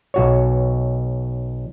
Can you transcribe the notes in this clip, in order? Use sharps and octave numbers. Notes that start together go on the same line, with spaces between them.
B1 F#4 C#5